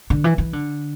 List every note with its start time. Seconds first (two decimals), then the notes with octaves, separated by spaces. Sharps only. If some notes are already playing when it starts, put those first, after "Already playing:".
0.10 D3
0.24 E3
0.38 E3
0.53 D3